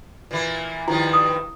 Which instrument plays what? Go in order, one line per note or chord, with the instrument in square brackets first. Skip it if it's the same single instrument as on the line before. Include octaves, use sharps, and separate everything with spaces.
[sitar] A#2 E3 A#3
[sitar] G2 D#3 F3 [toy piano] E4
[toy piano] D#6